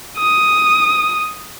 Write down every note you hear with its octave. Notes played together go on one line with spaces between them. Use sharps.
D#6